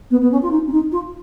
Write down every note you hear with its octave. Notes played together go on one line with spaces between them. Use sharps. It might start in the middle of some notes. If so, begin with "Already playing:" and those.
B3
B3
C#4
F4
D#4
C#4
D#4
F4